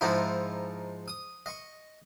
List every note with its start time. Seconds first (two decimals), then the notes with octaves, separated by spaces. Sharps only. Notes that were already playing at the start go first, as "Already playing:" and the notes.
0.01 G#2 F3 D#4 E4
1.08 D#6
1.46 D#5 C#6